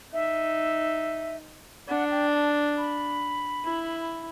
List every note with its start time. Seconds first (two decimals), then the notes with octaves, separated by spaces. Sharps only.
0.13 D#4 E5
1.89 D4 F#5
2.11 G5
2.33 A5
2.77 B5
3.65 E4